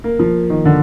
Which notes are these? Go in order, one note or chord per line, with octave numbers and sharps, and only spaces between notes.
A#3
F3
D#3
D3